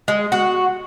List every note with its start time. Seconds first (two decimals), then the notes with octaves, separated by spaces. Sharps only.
0.08 G#3
0.32 F#4